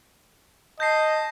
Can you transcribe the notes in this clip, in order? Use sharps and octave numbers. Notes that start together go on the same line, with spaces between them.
D#5 A5 G6 A#6 C7